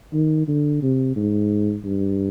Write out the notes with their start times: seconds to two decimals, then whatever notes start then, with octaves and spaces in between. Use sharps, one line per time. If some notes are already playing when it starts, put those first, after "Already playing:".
0.13 D#3
0.47 D3
0.82 C3
1.16 G#2
1.84 G2